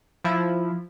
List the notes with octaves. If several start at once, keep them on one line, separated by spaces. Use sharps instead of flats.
F3 E4